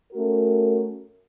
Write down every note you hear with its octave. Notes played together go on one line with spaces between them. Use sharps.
A3 C#4 F#4 A#4